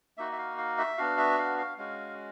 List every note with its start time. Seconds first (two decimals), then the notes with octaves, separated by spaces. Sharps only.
0.17 A#3 D#4 F#4 E5
0.32 E5
0.38 F5
0.58 F5
0.78 E5
0.98 B3 D4 F#4 F5
1.18 E5
1.38 F5
1.58 F5
1.78 G#3 C#4 F#4 F5